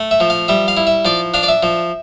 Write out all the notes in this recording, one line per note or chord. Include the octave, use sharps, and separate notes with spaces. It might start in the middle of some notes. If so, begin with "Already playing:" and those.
Already playing: A3
E5
F3
F5
G3 E5
F5
E4
E5
F3 D5
D4 F5
D5
E5
F3